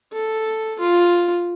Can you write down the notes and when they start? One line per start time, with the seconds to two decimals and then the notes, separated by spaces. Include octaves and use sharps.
0.12 A4
0.80 F4